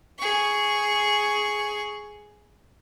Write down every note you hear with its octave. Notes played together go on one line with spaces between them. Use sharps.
G#4 C#6